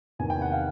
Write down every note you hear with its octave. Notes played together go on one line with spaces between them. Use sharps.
E2 C3 D#3 G#5
G5
F#5
F5